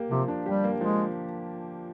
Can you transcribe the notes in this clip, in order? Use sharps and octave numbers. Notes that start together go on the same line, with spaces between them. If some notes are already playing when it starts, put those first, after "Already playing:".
Already playing: A#3 G4
C3 F3
D4
G3 G4
A#3
F3 G#3